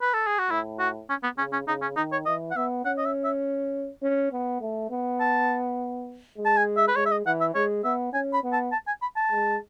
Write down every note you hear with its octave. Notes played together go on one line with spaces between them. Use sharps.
B4
A4
G#4
F#4
A2 E4
F#4
C#4
B3
C#3 C#4
C#4
C#3 D#4
C#4
D#3 D#4
C#5
E3 D#5
F#5
B3 E5
C#4 F#5
D#5
E5
E5
C#4
B3
A3
B3
A5
G#3
A5
G#5
E5
B4
G#3 C#5
E5
D#5
E3 F#5
E5
G#3 C#5
B3 E5
C#4 G#5
B5
B3
A5
A5
G#5
B5
A5
G#3